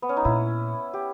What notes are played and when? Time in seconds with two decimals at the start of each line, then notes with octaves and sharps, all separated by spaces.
0.02 B3
0.09 C#4
0.17 D#4
0.25 A#2 E4
0.94 G4